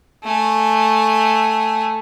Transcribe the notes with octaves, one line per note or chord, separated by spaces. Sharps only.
A3 G#5